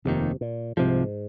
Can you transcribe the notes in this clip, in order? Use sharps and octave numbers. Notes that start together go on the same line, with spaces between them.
F1 D#2 C3 D#3
A#2
C2 G#2 C3 F3